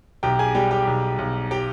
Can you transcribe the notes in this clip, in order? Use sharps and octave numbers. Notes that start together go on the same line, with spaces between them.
B1 G4 G5
G#4 G#5
G3 G4 G5
G4 G5
B1
B1
G4 G5